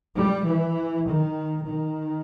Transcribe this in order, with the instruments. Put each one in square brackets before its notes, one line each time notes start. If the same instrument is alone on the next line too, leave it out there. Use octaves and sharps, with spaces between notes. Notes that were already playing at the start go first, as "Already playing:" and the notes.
[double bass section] G3
E3
D#3
D#3